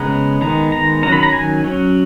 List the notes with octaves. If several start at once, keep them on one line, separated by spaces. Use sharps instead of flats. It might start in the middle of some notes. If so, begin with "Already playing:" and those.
Already playing: C#3 G#3 B3 A#5
D#3 G#3 B3 A#5
A#5
D#3 F#3 C#4 A#5
B5
A#5
G#5
F#3 C#4